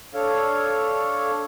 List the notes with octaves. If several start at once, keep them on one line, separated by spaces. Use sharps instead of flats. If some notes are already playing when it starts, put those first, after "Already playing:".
D4 A4 C#5 F5